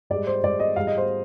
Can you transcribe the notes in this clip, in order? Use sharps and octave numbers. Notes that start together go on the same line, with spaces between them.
G#2 G3 D5
C5
G#2 G3 D5
D#5
G#2 G3 F5
D#5
C5